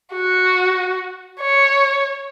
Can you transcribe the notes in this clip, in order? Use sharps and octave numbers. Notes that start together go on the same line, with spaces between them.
F#4
C#5